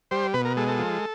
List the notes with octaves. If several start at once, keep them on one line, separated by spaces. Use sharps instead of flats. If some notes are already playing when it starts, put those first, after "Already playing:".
G3 C5
B2 B4
A#4
G#3 A4
A4
F3